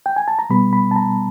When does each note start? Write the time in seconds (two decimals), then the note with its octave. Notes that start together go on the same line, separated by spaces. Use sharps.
0.06 G5
0.16 G#5
0.28 A5
0.39 A#5
0.50 B2 G3 B3 B5
0.73 B5
0.91 A5
0.96 A#5